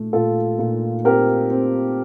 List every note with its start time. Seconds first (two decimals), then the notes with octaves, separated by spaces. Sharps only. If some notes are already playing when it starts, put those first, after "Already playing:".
Already playing: A#2 A3
0.13 A#2 F4 A4
0.59 A#2
1.04 C4 G4 A#4
1.50 C4